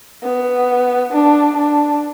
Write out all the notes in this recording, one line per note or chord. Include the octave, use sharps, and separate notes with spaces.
B3
D4
D4